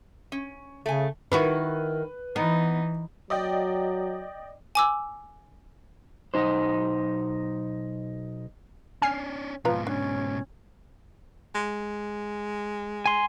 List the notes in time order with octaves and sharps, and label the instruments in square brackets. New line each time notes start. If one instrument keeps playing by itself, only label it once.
[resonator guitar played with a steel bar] C#4
[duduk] C#3 [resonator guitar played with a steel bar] A3 G#5
[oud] D#3 E4 F#4 [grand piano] B4
[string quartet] E3 D#4 [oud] B3
[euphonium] F#3 [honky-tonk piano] D5 D#5 G5
[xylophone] G#5 D6 E6
[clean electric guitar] B1 D#4 C5
[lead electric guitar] C#4 D4 [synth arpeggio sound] G#5 F6 C7
[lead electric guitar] G#2 B2 [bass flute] F3 [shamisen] F4 B4 A#5
[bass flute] C#4 [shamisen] D4
[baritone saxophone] G#3
[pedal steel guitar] G#5 C6